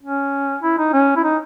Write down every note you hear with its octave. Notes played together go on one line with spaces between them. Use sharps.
C#4
E4
D#4
C#4
E4
D#4